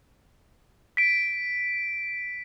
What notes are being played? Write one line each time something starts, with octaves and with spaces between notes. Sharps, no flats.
B6 D7